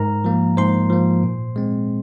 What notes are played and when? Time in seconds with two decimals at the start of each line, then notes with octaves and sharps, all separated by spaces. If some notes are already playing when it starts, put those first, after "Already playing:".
Already playing: G#2 A#4 A#5
0.24 F3 A#3
0.57 G#2 C5 C6
0.90 F3 A#3
1.23 A#2
1.56 G#3 C4